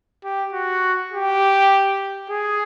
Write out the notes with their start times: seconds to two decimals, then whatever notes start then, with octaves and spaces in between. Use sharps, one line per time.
0.24 G4
0.53 F#4
1.12 G4
2.30 G#4